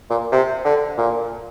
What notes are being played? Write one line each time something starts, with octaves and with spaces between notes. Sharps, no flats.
A#2
C3
D3
A#2